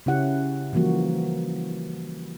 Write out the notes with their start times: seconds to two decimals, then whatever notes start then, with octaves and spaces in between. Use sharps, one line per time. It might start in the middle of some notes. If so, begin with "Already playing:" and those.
0.06 C#3 C#4 E4 G4 F#5
0.73 E3 F3 G3 A#3 F#4